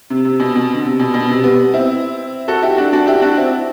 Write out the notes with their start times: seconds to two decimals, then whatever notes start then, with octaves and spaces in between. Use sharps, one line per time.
0.10 C3
0.25 C3
0.40 B2
0.55 B2
0.74 D3
0.85 C3
0.99 B2
1.14 B2
1.29 C3
1.44 G3 B3
1.74 C4 E4
2.48 F#4 A4
2.62 E4 G4
2.77 D4 F#4
2.93 D4 F#4
3.07 E4 G4
3.22 D4 F#4
3.37 C4 E4